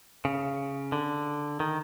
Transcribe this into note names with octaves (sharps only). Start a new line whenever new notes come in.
C#3
D3
D#3